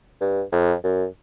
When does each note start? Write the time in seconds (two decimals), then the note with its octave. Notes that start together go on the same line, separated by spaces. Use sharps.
0.21 G2
0.52 F2
0.84 F#2